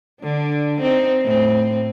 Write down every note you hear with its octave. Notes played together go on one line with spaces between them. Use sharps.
D3 D4
C4 D#4
A2 C4